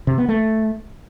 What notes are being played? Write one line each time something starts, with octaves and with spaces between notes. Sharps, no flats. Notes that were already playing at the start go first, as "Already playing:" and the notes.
C3
B3
A3